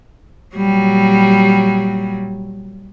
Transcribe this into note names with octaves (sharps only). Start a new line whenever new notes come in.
A#2 F#3 G3